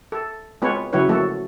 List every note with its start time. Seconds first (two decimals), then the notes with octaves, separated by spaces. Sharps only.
0.12 A4
0.62 G#3 B3 C4 F4 B4 C#5
0.93 C#3 F#3 E4 F#4 B4 C#5
1.09 F3 A3 A#3 F#4 A4